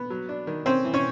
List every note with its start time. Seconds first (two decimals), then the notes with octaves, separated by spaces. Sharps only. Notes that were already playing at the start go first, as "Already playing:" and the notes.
Already playing: B3
0.10 F#3
0.29 D4
0.47 D#3
0.66 C4 C#4 C5
0.84 E3
0.94 C#4 C#5